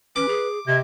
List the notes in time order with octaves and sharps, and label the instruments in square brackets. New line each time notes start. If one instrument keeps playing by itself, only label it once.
[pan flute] C#4 [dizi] B4 [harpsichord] D6
[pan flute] G#4
[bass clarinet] C3 [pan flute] D#5 [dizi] G#6